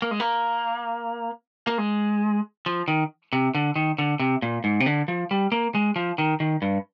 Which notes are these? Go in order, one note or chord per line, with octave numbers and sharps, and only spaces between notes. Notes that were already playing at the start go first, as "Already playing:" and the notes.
A#3
G#3
A#3
A#3
G#3
F3
D#3
C3
D3
D#3
D3
C3
A#2
G#2
C3
D3
F3
G3
A#3
G#3
F3
D#3
D#3
G2